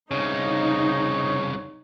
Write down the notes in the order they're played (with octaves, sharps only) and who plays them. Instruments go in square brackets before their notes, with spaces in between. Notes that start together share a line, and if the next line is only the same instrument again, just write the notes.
[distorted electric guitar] C2 C#3 [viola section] D#4 [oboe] C#5